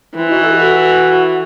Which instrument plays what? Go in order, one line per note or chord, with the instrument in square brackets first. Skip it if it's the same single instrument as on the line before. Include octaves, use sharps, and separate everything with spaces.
[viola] E3 [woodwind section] C4 E4
[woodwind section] D#4 F#4
F#4 A4
G4
F#4 A4